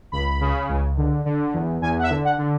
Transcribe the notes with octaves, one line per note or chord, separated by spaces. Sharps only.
C#2 B5
C#3
C#2
D3
D3
E2
E2 G#5
F#5
E5
D3
F#5
D3